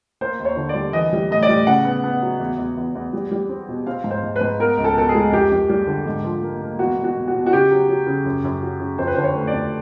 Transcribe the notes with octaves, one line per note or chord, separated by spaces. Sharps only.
A#3 C5
D#2
C#5
D3
D5
G3
E3 D#5
G3
A2 D#5
D5
G3
C#3 F#5
B3
B3
F#3
E2
E2
E2
E2
G3
G3
C4
B2
C4 F5
G#2
C5
G#2
B4
G#2
B3 A#4
C#2
A4
B2 A4
G#4
G#3
F2 G4
F2
G3
D3
G#2
F3
A#3
A#3
E2 F#4
B2
F#4
B2
F#4
B2
F#4
C#3 G4
F#3
F#3
C#3
F#2
F#2
F#3
C#3
F2 C5
B4
C5
D3
C#5
A3
D5
F2